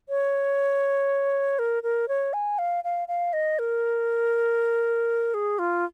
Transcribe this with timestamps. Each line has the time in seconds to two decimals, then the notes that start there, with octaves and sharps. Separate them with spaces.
0.09 C#5
1.59 A#4
1.83 A#4
2.08 C#5
2.33 G#5
2.58 F5
2.84 F5
3.08 F5
3.33 D#5
3.59 A#4
5.34 G#4
5.59 F4